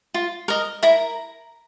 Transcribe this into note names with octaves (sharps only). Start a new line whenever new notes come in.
F4
A#4 D#5
E4 A#4 A#5